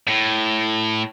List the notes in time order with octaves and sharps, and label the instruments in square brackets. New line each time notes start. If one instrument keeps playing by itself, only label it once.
[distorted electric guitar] A2